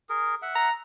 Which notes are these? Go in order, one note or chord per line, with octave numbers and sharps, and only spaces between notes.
G#4 A#4
E5 F#5
A#5